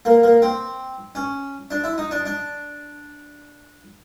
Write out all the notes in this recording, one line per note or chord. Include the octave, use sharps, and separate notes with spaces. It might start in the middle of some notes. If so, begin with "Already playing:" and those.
A#3
A#3
C4
C#4
D4
E4
D#4
D4
D4